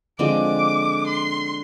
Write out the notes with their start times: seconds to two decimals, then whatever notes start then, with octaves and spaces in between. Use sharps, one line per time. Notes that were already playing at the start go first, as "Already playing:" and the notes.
0.19 D3 F3 G#3 C4 D6
1.07 C6